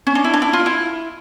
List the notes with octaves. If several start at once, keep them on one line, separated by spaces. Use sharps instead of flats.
C#4
D4
E4
D4
E4
F4
E4